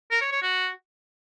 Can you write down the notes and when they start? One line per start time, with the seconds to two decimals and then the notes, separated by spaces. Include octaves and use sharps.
0.11 A#4
0.21 C#5
0.32 C#5
0.42 F#4